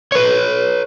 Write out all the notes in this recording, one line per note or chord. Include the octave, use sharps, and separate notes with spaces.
B4 C#5